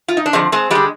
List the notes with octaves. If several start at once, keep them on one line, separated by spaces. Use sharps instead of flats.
F4
D#4
D4
D3 F3 G#3 C4
G#3 C4
D3 G3 G#3